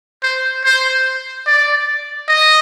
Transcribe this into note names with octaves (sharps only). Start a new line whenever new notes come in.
C5
C5
D5
D#5